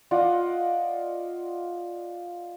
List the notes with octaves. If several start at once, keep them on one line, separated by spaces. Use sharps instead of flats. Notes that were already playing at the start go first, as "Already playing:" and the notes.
F4 D5 D#5 F#5